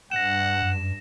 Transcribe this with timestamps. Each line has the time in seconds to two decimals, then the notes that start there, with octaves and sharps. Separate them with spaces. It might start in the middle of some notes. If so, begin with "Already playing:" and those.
0.11 G2 F#5 A#6 E7
0.62 F#2